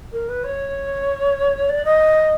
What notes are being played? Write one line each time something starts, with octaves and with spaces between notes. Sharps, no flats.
A#4
B4
C#5
D5
D#5